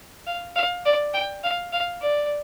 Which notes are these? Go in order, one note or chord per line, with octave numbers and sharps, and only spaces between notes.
F5
F5
D5
G5
F5
F5
D5